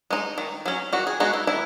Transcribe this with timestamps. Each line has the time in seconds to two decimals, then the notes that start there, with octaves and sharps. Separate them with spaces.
0.10 G#3 D#4
0.38 D#3
0.66 F#3 C#4
0.93 D#3 F#4
1.07 G#4
1.20 G#3 B3 D#4 F#4
1.33 E4
1.47 D#3 E4